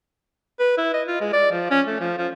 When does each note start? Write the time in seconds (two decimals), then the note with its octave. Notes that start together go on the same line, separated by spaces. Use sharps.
0.59 B4
0.78 E4
0.94 D#5
1.07 F4
1.21 G#3
1.33 D5
1.51 F3
1.71 C#4
1.86 A3
2.00 F3
2.18 F3